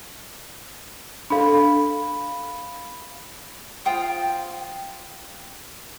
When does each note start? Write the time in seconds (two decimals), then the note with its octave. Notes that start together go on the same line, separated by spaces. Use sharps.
1.30 D4 A4 F5 B5
3.85 F4 C5 G5 D#6